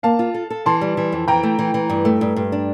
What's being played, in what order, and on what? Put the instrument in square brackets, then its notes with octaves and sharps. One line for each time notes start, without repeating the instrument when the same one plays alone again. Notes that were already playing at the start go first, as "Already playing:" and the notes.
[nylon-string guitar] A#3 [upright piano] F5 A5
[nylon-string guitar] F4
A4
A4
[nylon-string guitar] E3 [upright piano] A5 C6
[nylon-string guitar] G3
E3
F2
[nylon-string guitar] E3 [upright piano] G5 A#5
[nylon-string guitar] A3
E3
E3
G2
A3
G2
G2
D4